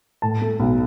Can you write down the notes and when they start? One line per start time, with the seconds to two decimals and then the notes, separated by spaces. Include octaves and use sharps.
0.22 A2 A5
0.41 A3
0.60 B1